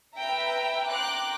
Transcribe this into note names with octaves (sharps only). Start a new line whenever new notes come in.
B4 E5 G5 A#5
G5 A#5 C6 D6 F#6